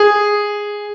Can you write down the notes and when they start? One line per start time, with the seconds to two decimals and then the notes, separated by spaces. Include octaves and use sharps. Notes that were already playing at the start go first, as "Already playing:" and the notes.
Already playing: G#4